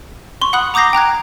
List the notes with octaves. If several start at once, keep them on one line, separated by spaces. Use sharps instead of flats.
C6 C#6
F#5 B5 D#6 F#6
A#5 D6 D#6 G6 A#6 C7
G5 A#5 F#6 G#6